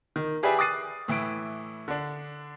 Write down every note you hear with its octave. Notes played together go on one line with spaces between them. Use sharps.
D#3
G4 G#4 B4 D5 E5 G#5
D6 D#6 F#6 A6 C7 D#7
A2 E3 E4 D7
D3 D4